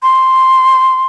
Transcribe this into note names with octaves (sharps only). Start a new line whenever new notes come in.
C6